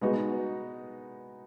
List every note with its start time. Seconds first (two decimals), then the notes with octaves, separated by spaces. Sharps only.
0.01 G#3 B3 D#4 F#4